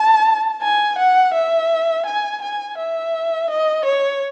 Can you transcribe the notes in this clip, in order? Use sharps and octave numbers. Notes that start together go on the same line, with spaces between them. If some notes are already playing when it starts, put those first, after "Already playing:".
Already playing: A5
G#5
F#5
E5
G#5
G#5
E5
D#5
C#5